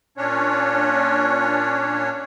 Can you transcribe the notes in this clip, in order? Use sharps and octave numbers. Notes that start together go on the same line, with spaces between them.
A#2 C#4 D4 C#5